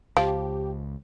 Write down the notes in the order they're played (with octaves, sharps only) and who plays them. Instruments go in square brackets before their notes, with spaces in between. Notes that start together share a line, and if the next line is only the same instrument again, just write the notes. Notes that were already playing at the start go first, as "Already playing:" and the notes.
[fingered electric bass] C#2 [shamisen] F3 [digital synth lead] G4 [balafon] F5